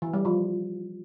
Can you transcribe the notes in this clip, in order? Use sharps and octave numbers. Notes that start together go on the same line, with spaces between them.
E3
G3
F3